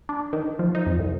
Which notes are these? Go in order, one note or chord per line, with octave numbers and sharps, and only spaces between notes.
D4
D#3
F3
D#4
F2
C2